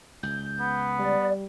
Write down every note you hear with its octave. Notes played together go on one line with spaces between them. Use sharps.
C#2 G6
B3
G3 D5